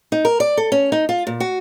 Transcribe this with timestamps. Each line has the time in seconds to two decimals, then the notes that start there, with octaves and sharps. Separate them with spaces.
0.12 D#4
0.25 A#4
0.40 D5
0.57 A4
0.72 C#4
0.92 D#4
1.09 F4
1.27 A#2
1.40 F#4